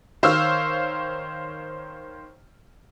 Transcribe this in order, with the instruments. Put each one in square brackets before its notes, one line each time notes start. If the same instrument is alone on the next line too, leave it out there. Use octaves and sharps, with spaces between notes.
[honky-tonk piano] D#3 C5 C#5 F5 E6 F6